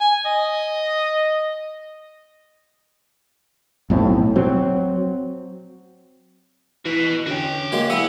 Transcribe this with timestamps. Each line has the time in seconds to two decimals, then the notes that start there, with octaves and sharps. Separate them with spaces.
0.01 G#5
0.25 D#5
3.90 B1 A2 F#3 C4
4.36 F#3 C4
6.86 E3 F#4 B4
7.27 D3 C#4 F#4 G5
7.72 F#3 G#3 A#3
7.90 B3 E4 G#4 E5